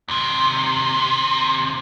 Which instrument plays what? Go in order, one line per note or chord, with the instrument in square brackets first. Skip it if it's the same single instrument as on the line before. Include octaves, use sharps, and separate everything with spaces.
[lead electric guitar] D#2 C3